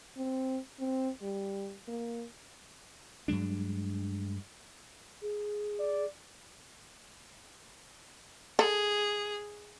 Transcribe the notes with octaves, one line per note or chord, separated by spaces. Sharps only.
C4
C4
G3
A#3
G2 F#3 G#3 D4
G#4
D5
G#4 A4